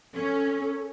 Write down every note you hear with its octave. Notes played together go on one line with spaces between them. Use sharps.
C#4 A4